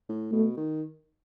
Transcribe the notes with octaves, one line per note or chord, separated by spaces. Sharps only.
A2
B2 A3
D#3